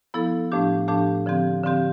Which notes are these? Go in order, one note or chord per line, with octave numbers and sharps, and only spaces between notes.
F3 B3 E4 A4
A2 F3 A3 D4 G4
A2 F3 A3 D4 G4
D3 F3 C4 G4
D3 F3 C4 G4